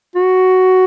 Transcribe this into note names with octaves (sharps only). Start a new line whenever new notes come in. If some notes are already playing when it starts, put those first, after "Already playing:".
F#4